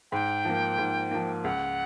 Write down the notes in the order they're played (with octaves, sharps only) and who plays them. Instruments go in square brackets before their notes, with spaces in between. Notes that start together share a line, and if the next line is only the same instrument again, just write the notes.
[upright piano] G#2 [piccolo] G5
[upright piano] F3 A#3
G#2
F3 A#3
[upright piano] C#2 [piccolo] F#5